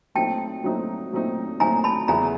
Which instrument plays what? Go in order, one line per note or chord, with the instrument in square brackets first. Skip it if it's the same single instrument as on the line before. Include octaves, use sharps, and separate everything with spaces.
[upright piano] A#2 F#3 A3 C4 D#4 [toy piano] G5 A5
[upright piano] A#2 F#3 A3 C4 D#4
A#2 F#3 A3 C4 D#4
[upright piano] A#2 F#3 A3 C4 D#4 [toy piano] G#5 A#5
[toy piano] A5 B5
[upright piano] E2 C#3 F#3 B3 E4 [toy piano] G#5 A#5